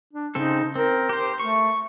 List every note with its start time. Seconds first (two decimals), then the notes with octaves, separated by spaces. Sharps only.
0.13 D4
0.35 C#3 C4 D#4 A4
0.76 C4 A#4
1.09 G4 C5
1.39 A3 C#6